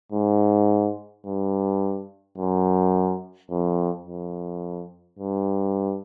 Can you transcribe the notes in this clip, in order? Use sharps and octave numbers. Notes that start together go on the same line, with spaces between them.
G#2
G2
F#2
F2
F2
G2